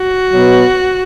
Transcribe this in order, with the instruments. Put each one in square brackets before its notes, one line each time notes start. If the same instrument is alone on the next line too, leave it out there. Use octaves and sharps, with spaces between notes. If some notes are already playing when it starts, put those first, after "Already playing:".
Already playing: [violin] F#4
[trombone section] B2 F#3 B3